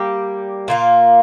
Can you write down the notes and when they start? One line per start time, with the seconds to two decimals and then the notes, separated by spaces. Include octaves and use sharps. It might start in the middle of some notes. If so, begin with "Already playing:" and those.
Already playing: G3 A#3 G4
0.68 A#2 A#3 F4